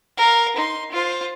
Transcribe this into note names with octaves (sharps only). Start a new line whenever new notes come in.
A#4 F5
D#4 C6
F4 C5